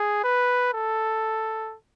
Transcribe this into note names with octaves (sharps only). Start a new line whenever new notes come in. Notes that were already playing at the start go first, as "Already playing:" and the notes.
Already playing: G#4
B4
A4